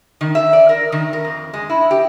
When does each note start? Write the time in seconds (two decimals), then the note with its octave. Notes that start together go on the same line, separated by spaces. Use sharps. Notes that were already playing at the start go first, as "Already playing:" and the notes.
0.21 D#3
0.35 E5
0.53 D5
0.69 A#4
0.92 D#3
1.13 A#4
1.25 F2
1.54 G#3
1.70 E4
1.91 G4